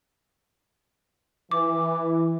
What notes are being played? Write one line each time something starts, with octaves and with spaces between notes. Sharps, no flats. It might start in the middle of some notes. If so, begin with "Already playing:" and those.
E3 D6